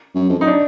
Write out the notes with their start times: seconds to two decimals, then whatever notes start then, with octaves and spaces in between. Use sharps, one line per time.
0.15 F#2
0.29 F2
0.39 F#2 D#4
0.47 D4